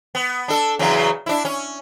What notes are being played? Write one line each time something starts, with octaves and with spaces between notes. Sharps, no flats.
B3
D4 A4
E2 C#3 F#3
D4 E4
C#4